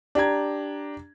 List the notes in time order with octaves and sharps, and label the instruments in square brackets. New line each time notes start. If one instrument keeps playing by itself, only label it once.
[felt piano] D4 G4 A#5 G#6